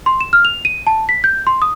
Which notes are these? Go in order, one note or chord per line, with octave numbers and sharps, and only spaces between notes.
C6
E7
F6
F7
D#7
A5
B6
G6
C6
D#6